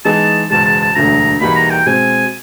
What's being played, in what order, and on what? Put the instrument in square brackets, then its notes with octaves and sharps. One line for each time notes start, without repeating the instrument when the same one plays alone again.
[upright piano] E3 G#3 B3 D#4 G#4 [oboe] A5
[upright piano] F#1 E2 B2 G#3 [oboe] A5
[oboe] A5
A5
[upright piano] E1 D2 D3 F#3 A3 [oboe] A#5
[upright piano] E2 B2 G3 A#3 D#4 [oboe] B5
[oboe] A#5
G5
[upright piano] B2 G#3 C4 [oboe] G#5